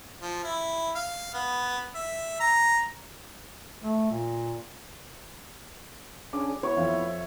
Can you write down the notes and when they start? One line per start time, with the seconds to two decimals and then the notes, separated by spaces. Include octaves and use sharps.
0.22 F3
0.44 E4
0.95 F5
1.34 B3
1.95 E5
2.40 A#5
3.83 A3
4.11 A#2
6.33 C#4 D4 G#4 D6
6.63 B3 E4 C#5
6.77 F2 E5 F5